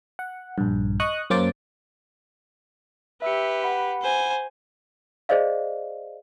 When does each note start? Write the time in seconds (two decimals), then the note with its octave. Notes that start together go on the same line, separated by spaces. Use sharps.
0.19 F#5
0.58 A#1 G2
1.00 D#5 C#6 D#6 F#6
1.30 F#2 A#3 C#4 C5 D6 A6
3.22 G4 B4 E5 E6 C#7
3.64 F#5 B5
4.02 C5 G#5
5.29 G#4 C5 D5 D#5 F5